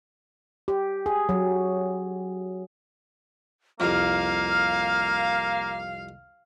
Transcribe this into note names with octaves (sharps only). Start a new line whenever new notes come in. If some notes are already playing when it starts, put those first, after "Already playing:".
G4
G#4
F#3
C2 F2 A#3 F5 F6